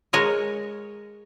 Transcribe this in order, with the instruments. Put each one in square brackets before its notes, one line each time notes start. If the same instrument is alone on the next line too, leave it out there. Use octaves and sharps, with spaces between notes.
[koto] G#3 A#4 C#5 D#5